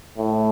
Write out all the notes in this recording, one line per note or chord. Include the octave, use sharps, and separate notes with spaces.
A2